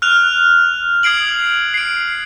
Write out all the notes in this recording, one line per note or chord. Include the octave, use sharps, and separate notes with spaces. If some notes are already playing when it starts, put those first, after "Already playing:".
F6 F#6 F7
D#6 G#6 C7 D7 F#7
C7 D7